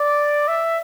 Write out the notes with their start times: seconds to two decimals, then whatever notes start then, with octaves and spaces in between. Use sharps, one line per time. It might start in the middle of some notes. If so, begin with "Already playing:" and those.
Already playing: D5
0.48 E5